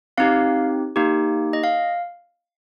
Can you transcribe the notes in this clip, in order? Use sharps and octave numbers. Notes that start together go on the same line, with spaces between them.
C4 D#4 G4 F5
A#3 D#4 G4
D#5
F5